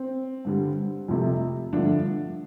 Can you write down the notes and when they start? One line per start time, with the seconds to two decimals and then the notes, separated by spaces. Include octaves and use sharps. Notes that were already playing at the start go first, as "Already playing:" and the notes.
Already playing: C4
0.45 G2 D3 G3
1.08 F2 C3 A3
1.73 G2 D3 F3 A3 D4